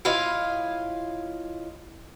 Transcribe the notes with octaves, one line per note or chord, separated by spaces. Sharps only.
E4 F4 C#5 D#5 F5